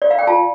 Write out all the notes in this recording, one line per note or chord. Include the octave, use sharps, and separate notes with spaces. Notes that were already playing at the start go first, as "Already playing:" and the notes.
D5
F5
G5
F4 A5